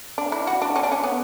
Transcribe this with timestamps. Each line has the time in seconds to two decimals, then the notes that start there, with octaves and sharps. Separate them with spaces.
0.18 D4
0.32 E4
0.47 F#4
0.62 D4
0.76 C#4
0.83 D4
0.92 C#4
1.03 B3